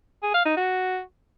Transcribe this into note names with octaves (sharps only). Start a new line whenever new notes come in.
G#4
F5
D#4
F#4